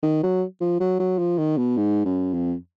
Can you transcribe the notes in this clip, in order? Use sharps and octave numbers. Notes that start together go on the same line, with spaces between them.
D#3
F#3
F3
F#3
F#3
F3
D#3
B2
G#2
F#2
F2